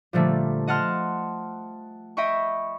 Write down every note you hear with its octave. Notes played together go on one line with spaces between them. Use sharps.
A#2 D3 F3 G3 A3
D#5 F#5 A5 C6 F6
D#5 E5 G5 B5 C#6